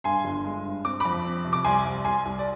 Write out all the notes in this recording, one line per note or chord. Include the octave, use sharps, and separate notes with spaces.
G2 G#5 C6
G1
G#3
G2
C4 D6
F2 B5 D6
C4
C3
D6
C2 G#5 C6
C2
C2 G#5 C6
C2
D5